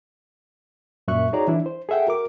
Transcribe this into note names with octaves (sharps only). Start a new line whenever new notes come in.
F#2 A#2 E5 C#6 F#6
D#4 F#4 G#4 C#5 D5 A#5
E3 D4 E4
C5
G#4 A4 E5 F#5 G5
F#4 A#4 D6